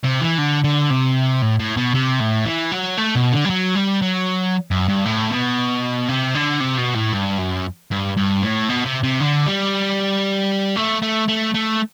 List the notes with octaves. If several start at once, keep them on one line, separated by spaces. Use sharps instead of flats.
C3
E3
D3
D3
C3
A2
A2
B2
C3
A2
E3
F#3
A3
B2
D3
G3
F#3
G3
F#3
F#2
G2
A2
B2
C3
D3
C3
B2
A2
G2
F#2
G2
G2
A2
B2
C3
C3
D3
G3
A3
A3
A3
A3